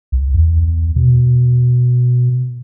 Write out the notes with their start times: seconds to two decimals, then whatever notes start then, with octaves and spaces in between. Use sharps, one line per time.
0.12 C2
0.34 E2
0.96 B2